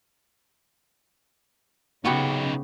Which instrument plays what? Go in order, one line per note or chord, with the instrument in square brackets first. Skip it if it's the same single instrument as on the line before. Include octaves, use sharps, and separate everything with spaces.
[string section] C#3 [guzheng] B3 F#4 G4 [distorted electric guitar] D#4 B4